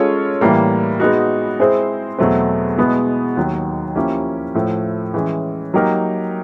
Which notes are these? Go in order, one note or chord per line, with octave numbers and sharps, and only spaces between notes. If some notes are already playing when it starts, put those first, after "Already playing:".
Already playing: G#3 C#4 F4 A4 C#5
A2 E3 G3 A#3
G#3 B3 D#4 F#4
G#3 C4 E4 G#4 C5
E2 B2 F#3 A3 C4
B2 G#3 B3 E4 G#4
D#2 D#3 F#3
F3 A#3 C#4 E4 G4
A2 F3 A3
E3 G#3 C#4
F#3 A#3 D#4 G4 A#4